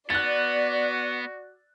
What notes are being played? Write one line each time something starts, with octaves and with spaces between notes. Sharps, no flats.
B3 F#4 D5 F#6 A6